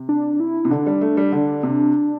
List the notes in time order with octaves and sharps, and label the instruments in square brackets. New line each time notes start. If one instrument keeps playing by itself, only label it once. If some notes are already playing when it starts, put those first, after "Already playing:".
Already playing: [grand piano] C3
[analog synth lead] D4
E4
[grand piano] C3
[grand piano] D3 [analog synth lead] D4
[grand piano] G3
A3
G3
D3
C3